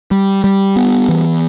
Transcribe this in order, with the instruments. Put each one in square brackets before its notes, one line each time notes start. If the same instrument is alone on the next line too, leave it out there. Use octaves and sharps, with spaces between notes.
[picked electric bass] G3
G3
B3
E3